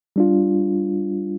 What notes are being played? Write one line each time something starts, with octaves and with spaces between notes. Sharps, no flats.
G3 D4 F4